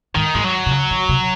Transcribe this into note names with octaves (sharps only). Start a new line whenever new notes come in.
G#2 D#3
G#2 G#3
F#3
C3
C#3
D#3
C3